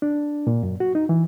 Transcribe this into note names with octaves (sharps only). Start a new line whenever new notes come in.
D4
A#2
F#2
F#4
D#4
E3